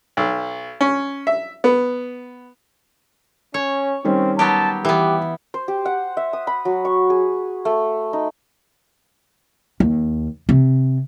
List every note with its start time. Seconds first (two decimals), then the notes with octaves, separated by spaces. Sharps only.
0.17 B1
0.81 C#4
1.27 E5
1.64 B3
3.54 C#4 C#5
4.04 D#3 G3 C4 C#4
4.39 F#3 B3 G4 A5
4.85 E3 B3 G4
5.54 C5
5.68 G4
5.85 F#5
6.17 E5
6.33 D#6
6.47 B5
6.65 F#3
6.85 C#6
7.10 G#4
7.65 A3
8.13 D#4
9.80 D#2
10.49 C3